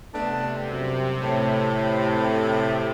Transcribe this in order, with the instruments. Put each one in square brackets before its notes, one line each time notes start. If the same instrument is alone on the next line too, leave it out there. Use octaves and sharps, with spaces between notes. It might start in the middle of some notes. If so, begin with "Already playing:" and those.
[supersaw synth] C3 [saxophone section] A3 B3 D4
[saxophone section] F#2 G3
A2